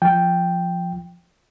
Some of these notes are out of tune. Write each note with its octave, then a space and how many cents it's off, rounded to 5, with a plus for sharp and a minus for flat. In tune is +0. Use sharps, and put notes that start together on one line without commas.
F3 +0 G5 +0